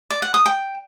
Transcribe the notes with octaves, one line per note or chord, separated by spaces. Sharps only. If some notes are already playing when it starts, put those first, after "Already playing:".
D5
F#5
D#6
G5